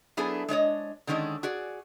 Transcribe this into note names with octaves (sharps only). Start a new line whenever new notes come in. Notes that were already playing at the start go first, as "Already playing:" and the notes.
F#3 B3 D4 E4 G#4 A4
G#3 D4 C#5 D#5
D3 D#3 G#3 C#4 D4
F#4 G#4 D5